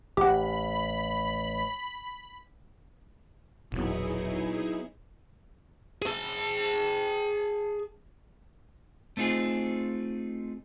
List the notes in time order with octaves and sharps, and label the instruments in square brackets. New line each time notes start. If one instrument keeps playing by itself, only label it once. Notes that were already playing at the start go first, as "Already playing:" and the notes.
[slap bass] A1 [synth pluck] G4 F#5 [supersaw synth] B5
[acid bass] E1 [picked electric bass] A#1 [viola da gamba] F#3 B3 [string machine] D#4 E4 G#4
[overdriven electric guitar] G#4 A5
[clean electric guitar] A3 C4 D#4 F4 G#4